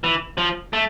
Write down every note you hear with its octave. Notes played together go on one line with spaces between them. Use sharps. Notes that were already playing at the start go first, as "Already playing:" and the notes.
E3
F3
A3